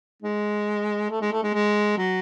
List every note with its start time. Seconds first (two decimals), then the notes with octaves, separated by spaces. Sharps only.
0.23 G#3
1.11 A3
1.22 G#3
1.32 A3
1.43 G#3
1.54 G#3
1.98 F#3